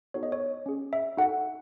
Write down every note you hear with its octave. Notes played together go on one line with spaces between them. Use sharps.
B3 D#4 F#4 A4 C#5
D#5
C#5
C#4 G#4
E5
D#4 F#4 A4 F#5